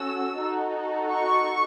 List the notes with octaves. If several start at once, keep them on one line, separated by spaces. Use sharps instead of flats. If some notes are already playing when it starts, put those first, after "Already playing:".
Already playing: C#4 F#4 A4 E6
D#4 F#4 A4
C#6